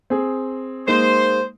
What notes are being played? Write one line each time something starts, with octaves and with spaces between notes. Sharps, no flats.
C4 G#4
G#3 A#3 D#4 C5